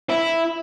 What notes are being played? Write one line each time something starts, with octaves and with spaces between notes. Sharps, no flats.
E4